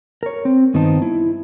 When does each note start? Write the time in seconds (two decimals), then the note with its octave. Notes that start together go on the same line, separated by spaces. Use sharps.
0.23 A#4 C#5
0.45 C4
0.74 G2 D#3 B3 C4 D#4 A5
1.02 E4